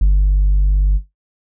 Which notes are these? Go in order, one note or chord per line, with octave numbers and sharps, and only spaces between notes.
G1